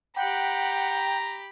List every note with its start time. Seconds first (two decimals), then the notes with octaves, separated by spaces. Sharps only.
0.16 G4 F#5 G5 A#5 B5